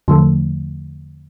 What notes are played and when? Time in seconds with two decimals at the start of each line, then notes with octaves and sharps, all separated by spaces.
0.08 E2 D3 F3 A3